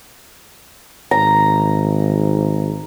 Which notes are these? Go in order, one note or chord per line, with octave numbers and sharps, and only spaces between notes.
G#1 A#5